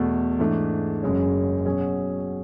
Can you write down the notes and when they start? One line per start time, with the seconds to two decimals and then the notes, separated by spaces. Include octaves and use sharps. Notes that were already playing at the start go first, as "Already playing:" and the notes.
Already playing: E2 B2 A3
0.39 G#2 E3 A3 D4
1.02 F#1 F#2 C#3 G#3 C#4
1.65 B2 F#3 C#4 G#4